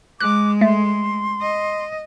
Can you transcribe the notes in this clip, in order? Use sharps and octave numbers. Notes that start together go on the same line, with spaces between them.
G#3 D6 F#6
A3 C6
D#5